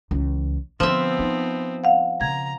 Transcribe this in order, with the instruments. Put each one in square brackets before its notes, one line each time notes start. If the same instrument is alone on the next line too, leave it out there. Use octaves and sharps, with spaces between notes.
[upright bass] C#2 E3
[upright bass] D3 [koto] F3 E5 [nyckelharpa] B3 C4
[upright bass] D#4
[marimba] F5 F#5
[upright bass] C#3 [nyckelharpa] A#5 [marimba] G#6